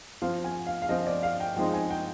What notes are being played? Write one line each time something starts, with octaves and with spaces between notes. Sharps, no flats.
F3 C4 F4 F5
G#5
F5
F5
F3 C4 F4 D#5
D5
F5
G5
F3 G#3 C4 D#4 G5
G#5
G5